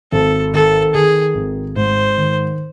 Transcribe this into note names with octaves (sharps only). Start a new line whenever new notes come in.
G#1 A4
D#3 A4
D#3 G#4
G#1
G#2 C5
D#3